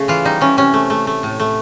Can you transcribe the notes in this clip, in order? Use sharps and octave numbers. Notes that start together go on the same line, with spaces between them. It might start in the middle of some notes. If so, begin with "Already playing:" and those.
Already playing: C#3 A3
E3 F4
G3 D#4
E3 C#4
C3 C#4
A3
A3
A3
A2
A3